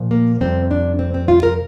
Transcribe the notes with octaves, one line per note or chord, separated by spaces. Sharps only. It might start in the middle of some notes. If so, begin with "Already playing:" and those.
Already playing: A#2 F3
A#3
F2 C3 G3 C4
D4
C4
C4
F4
A#4